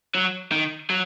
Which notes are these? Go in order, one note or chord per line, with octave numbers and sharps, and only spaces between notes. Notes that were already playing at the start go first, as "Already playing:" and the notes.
F#3
D#3
F#3